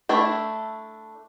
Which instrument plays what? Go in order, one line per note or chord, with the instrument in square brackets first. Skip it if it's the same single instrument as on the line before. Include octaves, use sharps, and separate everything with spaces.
[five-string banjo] A3 D4 E4